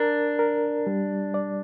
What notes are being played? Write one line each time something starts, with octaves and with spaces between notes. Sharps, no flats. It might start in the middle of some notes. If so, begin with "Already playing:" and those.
Already playing: D4 A#4
A#4
G3
D5